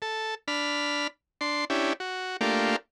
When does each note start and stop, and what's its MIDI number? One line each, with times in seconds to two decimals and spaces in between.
0.02 0.35 69
0.48 1.07 62
0.48 1.07 83
0.48 1.07 89
1.41 1.65 62
1.41 1.65 84
1.70 1.93 61
1.70 1.93 62
1.70 1.93 64
1.70 1.93 67
2.00 2.37 66
2.41 2.76 57
2.41 2.76 58
2.41 2.76 62
2.41 2.76 65
2.41 2.76 67